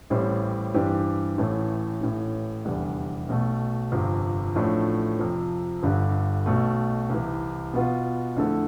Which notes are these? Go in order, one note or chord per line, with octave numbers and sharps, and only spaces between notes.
A1 A2 G3 C4
G2 E3 G3 C4 G4
A1 A2 E3 A3
A1 A2 E3
F1 E2 D3 G3 D4
B1 B2 A3
G1 F2 C3 F3
A1 A2 F3 A3 D4
F2 C3 F3
G1 G2 D3
B1 B2 A3
C2 C3 E3
B2 B3 F4
F2 D3 A3 E4 A4